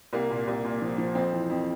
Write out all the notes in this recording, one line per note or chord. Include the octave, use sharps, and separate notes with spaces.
C2 A#3
A#2
C2
A#2
F3
F3
F2 C4
E3
F2